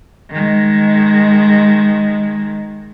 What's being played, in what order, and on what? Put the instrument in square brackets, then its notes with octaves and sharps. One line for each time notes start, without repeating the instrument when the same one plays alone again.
[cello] D#3 G#3